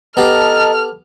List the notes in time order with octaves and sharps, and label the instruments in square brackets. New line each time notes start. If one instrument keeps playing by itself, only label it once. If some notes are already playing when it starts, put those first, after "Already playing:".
[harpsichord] B3 G4 [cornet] A4 [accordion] D#5 A5 A#5 [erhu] F6